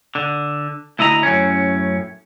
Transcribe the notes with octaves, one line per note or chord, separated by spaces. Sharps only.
D3
D2 E4 D#5 A#5
F#2 A2 C#4